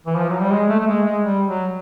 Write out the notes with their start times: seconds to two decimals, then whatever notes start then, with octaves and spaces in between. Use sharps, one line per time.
0.06 E3
0.17 F3
0.29 F#3
0.40 G3
0.51 G#3
0.69 A3
0.80 A3
0.87 G#3
1.05 G#3
1.24 G3
1.47 F#3